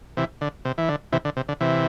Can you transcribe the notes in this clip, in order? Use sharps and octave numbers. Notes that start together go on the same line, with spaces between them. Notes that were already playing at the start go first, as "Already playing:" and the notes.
C3 E3
D3
C3
E3
D3
C3 E3
D3
C3
D3
C3 E3